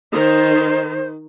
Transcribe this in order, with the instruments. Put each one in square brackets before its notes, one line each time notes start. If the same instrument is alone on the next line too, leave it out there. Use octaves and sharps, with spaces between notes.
[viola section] D#3 [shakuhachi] C5